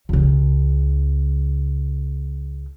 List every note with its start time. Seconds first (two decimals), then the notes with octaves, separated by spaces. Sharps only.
0.09 C#2 C#3